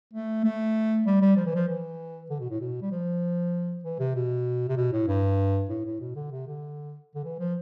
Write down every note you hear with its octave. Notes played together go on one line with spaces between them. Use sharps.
A3
A3
G3
G3
F3
E3
F3
E3
D3
B2
A2
B2
G3
F3
E3
C3
B2
C3
B2
A2
G2
A2
A2
B2
D3
C3
D3
D3
E3
F3